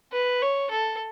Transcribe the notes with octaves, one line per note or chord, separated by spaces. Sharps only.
B4
C#5
A4